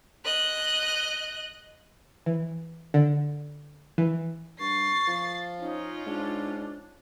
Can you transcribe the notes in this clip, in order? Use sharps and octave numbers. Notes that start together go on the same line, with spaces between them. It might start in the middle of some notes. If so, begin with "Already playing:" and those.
D#5 F#6
E3
D3
E3
G2 C#6 A6 C7
F3
C#4 D#4 F4
G#2 D4